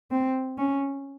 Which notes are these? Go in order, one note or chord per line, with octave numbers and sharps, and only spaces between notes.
C4
C#4